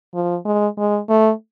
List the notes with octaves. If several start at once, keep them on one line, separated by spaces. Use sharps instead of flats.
F3
G#3
G#3
A3